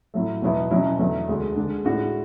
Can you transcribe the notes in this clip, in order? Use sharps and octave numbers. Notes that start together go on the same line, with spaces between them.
A2 F#3 A3
E2 B2 F#3 B3 E4
B2 F#3 C#4 E4
E2 D3 F#3 A3
D2 D3 G#3
D3 G#3 D4
A2 G#3 D4 F#4